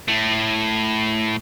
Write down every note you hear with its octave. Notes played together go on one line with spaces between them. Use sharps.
A2 A3